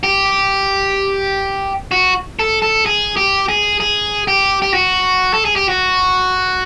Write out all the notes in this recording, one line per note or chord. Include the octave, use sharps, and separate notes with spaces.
G4
F#4
A4
A4
G#4
G4
G#4
G#4
G4
G4
F#4
A4
G#4
G4
F#4